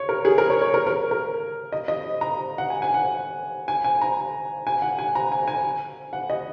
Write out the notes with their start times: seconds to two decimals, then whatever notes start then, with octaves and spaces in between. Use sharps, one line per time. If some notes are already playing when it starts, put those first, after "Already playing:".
Already playing: C#5
0.09 A#4
0.25 G#4
0.38 A#4
0.50 C#5
0.62 C#5
0.74 A#4
0.87 A#4
1.11 A#4
1.72 D#5
1.88 D#5
2.21 A#5
2.58 F#5
2.70 G#5
2.82 G#5
2.94 F#5
3.68 G#5
3.84 G#5
4.01 A#5
4.67 G#5
4.82 F#5
4.99 G#5
5.15 A#5
5.32 G#5
5.48 G#5
6.13 F#5
6.30 D#5